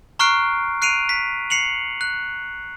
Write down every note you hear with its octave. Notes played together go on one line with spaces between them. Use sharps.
A#5 C#6 F6 F#6 C7 D7
F#6 C7 D7 D#7 F7
B6
C7 C#7 F7 F#7
F#6